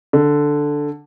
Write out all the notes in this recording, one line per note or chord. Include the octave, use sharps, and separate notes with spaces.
D3